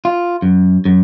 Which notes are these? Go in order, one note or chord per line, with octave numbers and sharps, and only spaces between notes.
F4
F#2
F#2